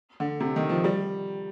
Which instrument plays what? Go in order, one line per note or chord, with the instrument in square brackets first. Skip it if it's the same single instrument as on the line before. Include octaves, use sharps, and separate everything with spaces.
[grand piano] D3
C3
D#3
F3
G3